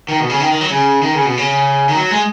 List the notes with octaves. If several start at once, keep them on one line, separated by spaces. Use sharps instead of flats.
D#3
B2
C#3
D#3
D#3
F#3
C#3
D#3
C#3
B2
C#3
D#3
F#3
G#3